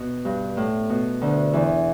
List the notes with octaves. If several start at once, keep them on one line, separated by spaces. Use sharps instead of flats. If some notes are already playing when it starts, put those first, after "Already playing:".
Already playing: B2
G2
A2
B2
D2 D3
E2 E3